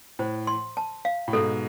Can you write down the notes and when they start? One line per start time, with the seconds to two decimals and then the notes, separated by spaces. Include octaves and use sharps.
0.19 A2 C5
0.47 C6
0.77 A5
1.05 F5
1.28 A2
1.33 G#2 B2 A4